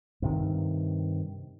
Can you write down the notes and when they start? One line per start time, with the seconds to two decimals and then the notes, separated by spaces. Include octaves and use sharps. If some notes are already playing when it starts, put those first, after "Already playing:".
0.22 G2 C3 D#3